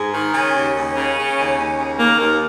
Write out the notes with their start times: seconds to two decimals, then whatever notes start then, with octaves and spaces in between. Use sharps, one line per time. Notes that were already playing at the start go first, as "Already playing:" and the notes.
Already playing: G#2 G#4
0.13 D#3
0.33 C#3 C#4
0.54 D#2
0.75 D#2
0.95 C#3
1.17 C#3
1.37 D#2
1.57 D#2
1.78 C#3
1.98 D#3 A#3
2.19 D#2 A#4